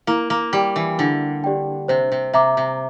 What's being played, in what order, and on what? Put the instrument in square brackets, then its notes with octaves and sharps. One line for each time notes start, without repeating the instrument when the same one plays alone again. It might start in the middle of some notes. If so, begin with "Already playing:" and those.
[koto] A#3 [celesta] E4
[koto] A#3
[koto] G3 [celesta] G4 D5 G5
[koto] E3
[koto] D3 [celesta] E4
[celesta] G4 D5 G5
[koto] C3 [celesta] C5
[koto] C3
[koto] C3 [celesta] E5 A#5 D6
[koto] C3